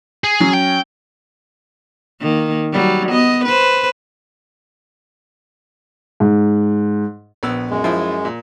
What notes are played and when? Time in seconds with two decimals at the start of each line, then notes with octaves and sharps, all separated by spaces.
0.24 G#4
0.40 F#3 C#4
0.54 G5
2.21 D#3 A#3
2.72 F#3 G3
3.09 B3 D#5
3.45 B4 C5
6.20 G#2
7.43 A#1 B3 E6
7.70 F#2 G#3
7.84 F3 E4
8.25 A#2